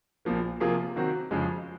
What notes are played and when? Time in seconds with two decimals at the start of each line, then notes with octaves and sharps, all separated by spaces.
0.25 A#1 A#2 F3 A#3
0.60 C3 F3 A#3 F4 G#4
0.96 D#3 F#3 C4 F#4
1.31 F2 C#3 F3 G#3